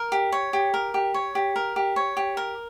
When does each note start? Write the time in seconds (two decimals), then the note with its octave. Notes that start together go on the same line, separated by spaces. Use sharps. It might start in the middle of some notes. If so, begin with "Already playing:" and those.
Already playing: A#4
0.12 G4
0.32 C#5
0.53 G4
0.74 A#4
0.94 G4
1.14 C#5
1.35 G4
1.56 A#4
1.76 G4
1.96 C#5
2.17 G4
2.37 A#4